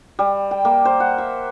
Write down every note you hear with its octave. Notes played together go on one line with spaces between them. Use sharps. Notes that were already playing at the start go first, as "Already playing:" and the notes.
G3
G5
A#3
C5
F#5
E5